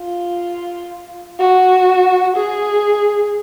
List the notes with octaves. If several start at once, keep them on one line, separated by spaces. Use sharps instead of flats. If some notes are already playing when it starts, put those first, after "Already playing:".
Already playing: F4
F#4
G#4